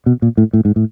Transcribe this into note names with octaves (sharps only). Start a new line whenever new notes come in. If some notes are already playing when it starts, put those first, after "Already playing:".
B2
A#2
A2
A2
G#2
A2